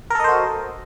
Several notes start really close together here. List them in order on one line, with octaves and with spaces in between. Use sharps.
A#4 A4 D#5 C5 F#4